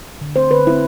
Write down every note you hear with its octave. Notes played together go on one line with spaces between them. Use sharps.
D3
A3 C4 C5
D3 B4
A3 C4 E4